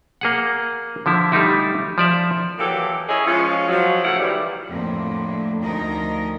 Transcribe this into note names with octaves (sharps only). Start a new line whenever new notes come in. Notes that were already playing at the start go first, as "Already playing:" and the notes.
A#3 G#4 F#5
D3 F3 E4
G3 A3 D#4 E4
F3 D5 E5
E3 F#3 A#3 G4 A4
C#4 E4 G#4 C#5 D#5
F3 G#3 C#4 F4
F3 F#3
A2 C#3 E4 F5 F#5
D#3 E3 G3
F2 A2 D3 A#3
D2 D#3 F3 D#4 A#4 D#5